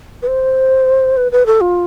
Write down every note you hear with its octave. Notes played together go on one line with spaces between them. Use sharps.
B4
C5
B4
B4
A4
F4